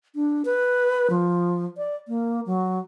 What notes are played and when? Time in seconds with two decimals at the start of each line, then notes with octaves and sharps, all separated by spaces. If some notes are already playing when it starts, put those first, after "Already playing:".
0.15 D4
0.45 B4
1.10 F3
1.77 D5
2.08 A#3
2.46 F#3